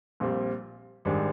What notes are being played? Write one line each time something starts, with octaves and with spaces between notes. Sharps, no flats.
A#1 A#2 G3 C4
G#1 G#2 G3 D4